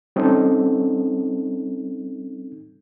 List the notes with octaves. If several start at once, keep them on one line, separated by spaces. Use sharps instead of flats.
G3 C4 C#4 D#4 A4